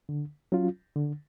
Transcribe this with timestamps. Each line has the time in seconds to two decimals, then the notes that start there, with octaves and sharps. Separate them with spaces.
0.09 D3
0.52 F#3 C#4 F4
0.96 D3